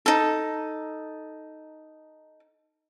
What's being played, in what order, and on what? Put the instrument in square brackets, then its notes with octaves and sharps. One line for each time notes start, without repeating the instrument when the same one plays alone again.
[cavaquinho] D#4 A4